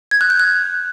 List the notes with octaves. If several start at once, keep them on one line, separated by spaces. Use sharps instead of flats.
G#6
F#6
G6
F#6